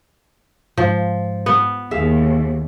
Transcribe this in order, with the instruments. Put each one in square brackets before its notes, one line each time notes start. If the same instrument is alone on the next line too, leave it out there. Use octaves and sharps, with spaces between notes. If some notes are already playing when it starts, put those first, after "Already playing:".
[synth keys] G#2 [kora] F3
[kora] B3
[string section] D#2 [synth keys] G#4 [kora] E5 F5